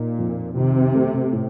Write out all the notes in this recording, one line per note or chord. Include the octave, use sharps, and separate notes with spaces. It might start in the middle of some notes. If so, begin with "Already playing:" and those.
Already playing: A#2 D#4
F2
C3 D#3
A3
A2